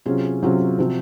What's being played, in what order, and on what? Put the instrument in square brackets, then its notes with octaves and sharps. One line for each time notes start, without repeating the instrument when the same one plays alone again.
[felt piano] C3 F#3 C#4 F4 G#4
C3 F#3 C#4 F4 G#4
C3 F3 C4 F#4